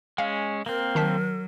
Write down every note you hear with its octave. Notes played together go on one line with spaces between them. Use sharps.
G#3 C#4 F5
A#3 C4 A#4
D#3 F#3 A5 B6